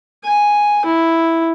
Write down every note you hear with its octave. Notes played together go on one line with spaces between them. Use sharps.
G#5
E4